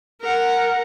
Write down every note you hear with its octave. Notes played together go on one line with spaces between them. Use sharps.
A#4 F#5